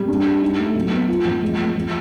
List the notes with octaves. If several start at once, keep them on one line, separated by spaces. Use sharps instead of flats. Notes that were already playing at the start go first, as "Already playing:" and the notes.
Already playing: G3
D4
G4
D#4
A3
F#3
B3
F4
F3
G#3
G#3
F3